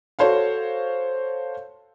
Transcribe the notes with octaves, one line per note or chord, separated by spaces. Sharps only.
F#4 A4 C5 C#5 F5